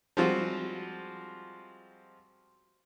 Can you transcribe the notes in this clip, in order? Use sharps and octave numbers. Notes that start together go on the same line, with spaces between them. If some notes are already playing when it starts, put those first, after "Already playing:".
F3 G3 G#3 C4 F4 F#4